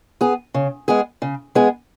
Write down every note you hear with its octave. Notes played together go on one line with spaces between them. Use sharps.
B3 G#4
C#3
G#3 B3 G#4
C#3
G#3 B3 G#4